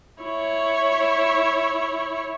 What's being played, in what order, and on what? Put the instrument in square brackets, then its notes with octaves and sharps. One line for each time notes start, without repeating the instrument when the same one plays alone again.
[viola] E4 C#5